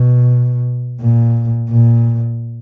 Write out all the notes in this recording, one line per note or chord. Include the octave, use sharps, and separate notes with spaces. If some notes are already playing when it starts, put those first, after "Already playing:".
Already playing: B2
A#2
A#2